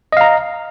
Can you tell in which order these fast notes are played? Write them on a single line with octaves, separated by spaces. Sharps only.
D#5 F5 A#5